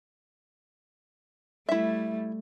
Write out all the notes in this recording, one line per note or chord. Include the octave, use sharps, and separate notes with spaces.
G3 A3 E4 E5